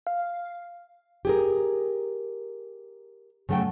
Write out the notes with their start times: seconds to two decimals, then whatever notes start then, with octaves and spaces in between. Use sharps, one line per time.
0.07 F5
1.25 G4 G#4 A#4
3.49 C#3 F#3 A3 F#5 G5